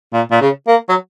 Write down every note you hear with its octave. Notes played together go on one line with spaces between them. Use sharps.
A#2
A#2
C#3
A#3
F#3